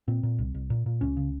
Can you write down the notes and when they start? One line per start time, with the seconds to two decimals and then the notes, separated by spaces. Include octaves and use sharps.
0.08 A#2 C4
0.23 A#2
0.38 C2
0.54 C2
0.70 A#2
0.86 A#2
1.01 C#2 C#4
1.17 C#3